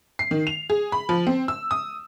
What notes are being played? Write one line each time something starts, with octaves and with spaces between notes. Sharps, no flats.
C7
D#3
F7
G#4
B5
F3
C4
E6
D#6